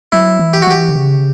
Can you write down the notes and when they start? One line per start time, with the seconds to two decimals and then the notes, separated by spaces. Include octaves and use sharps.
0.12 F#3 E4
0.39 E3
0.53 G4
0.62 F#4
0.67 E3 G4
0.89 D3
0.95 C#3